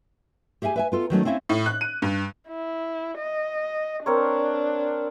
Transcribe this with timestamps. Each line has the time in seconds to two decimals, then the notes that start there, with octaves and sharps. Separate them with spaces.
0.62 G4 G#4 E5 F#5 G#5
0.76 B4 E5 G#5
0.92 B3 F4 A4
1.10 D#3 F#3 A3 C#4
1.25 C4 C#4 E4 E5 F5
1.49 A2
1.66 F#6
1.81 D#7
2.02 G2
2.48 E4
3.18 D#5
4.06 C4 D4 A#4 C#5